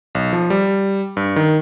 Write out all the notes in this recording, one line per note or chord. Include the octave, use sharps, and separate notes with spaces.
B1
F3
G3
G2
D#3